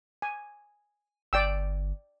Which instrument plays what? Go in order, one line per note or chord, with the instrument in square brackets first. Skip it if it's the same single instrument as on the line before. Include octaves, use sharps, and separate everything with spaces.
[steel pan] G#5
[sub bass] G1 [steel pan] D5 G5 E6